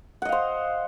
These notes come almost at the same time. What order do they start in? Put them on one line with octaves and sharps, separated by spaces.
F#5 D#5 F5 C5